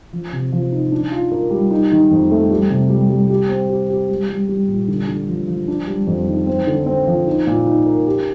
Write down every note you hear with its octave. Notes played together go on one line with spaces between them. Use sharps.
F3
C3
F3
D#4
D4
F4
A#4
G3
D#4
D#3
F2
A3
G3
C3
G3
G3
G4
C4
G4
G4
G3
G3
G3
A#2
D3
D3
F3
F3
D4
G3
F2
D#3
C4
D3
C4
F3
D#4
A#2
D#4
A#4
G4